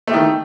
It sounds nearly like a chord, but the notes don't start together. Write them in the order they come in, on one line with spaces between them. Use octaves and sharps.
A3 G4 D#3